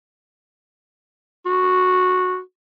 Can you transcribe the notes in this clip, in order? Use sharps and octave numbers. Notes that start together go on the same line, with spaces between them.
F#4